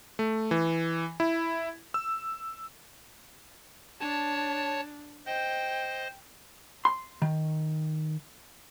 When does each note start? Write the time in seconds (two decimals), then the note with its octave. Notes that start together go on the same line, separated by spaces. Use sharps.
0.19 A3
0.51 E3
1.20 E4
1.94 E6
4.00 D4 C#5 A5
5.26 C5 D#5 G5
6.85 C6
7.22 D#3